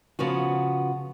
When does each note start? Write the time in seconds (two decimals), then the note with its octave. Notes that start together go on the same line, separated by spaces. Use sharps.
0.19 C#3 F3 B3 F#4